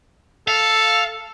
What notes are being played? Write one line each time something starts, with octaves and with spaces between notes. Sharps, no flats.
A4 F5